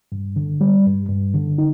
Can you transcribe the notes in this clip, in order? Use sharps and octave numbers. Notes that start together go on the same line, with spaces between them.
G2
D3
G3
G2
G2
D3
D#4